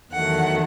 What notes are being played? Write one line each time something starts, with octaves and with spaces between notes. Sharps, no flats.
E2 D#3 F#3 A3 F#5